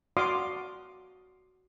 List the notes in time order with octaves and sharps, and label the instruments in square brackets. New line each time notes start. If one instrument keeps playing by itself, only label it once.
[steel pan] F#4 D5 F5 C6 D6 D#6